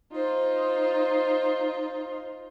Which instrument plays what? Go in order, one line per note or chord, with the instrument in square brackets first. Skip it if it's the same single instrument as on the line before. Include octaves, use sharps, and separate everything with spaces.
[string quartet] D#4 F4 C5